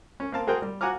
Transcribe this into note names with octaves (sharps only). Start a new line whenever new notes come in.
C#4
A#3 C4 F5 A5
F#4 G#4 A#4 C5 G5
G3
F#4 F#5 G#5 A#5 D6 F6